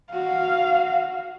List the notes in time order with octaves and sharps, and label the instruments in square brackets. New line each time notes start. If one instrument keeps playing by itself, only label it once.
[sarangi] F#4 [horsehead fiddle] F5